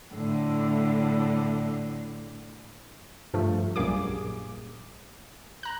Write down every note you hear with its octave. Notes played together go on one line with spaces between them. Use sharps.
A2 D3
G2 F3 A3
A#1 F#2 G3 A#3 G#4 D6
A#5 F#6